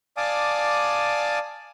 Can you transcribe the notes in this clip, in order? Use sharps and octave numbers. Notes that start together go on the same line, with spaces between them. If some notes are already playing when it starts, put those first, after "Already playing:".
D5 F5 G#5 A5 D6 D#6